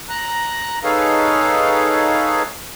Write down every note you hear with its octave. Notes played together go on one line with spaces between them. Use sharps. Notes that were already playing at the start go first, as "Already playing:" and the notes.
A#5 F#6
D#4 G#4 A4 B4 C#5 F5